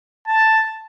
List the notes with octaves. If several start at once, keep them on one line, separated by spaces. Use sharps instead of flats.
A5